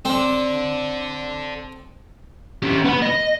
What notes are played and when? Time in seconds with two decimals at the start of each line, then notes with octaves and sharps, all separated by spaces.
0.05 C4 A4 D5
2.62 C#4 G4
2.84 B3 B5
3.02 D#5